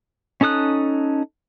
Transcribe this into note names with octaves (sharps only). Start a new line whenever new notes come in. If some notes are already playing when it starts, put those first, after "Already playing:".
C#4 D#4 A4 D#6 F#6